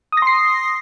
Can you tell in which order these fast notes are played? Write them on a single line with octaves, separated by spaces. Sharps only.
D#6 A#6 C6 C7